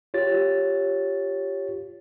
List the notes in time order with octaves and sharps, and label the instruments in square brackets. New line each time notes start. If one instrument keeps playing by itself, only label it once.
[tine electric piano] F4 G4 C#5 A6